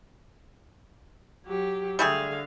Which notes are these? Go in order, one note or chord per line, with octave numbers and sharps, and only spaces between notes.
F#3 G4
D3 G3 A3 G#4 F5